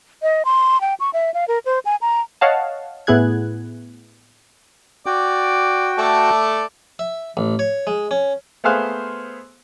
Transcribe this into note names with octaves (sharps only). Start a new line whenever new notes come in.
D#5
C6
G5
C#6
E5
F5
A#4
C5
G#5
A#5
C#5 D#5 F5 F#5 A5
A2 B3 E4 G#4 F#6 G#6
F#4 D5 G5
A3 A4 D5
E5
A1
C#5
G#3
C#4
A3 B3 G#4 C5 F5 F#6